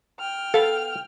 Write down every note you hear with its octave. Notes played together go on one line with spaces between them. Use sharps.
G5 F6
B3 A4 F5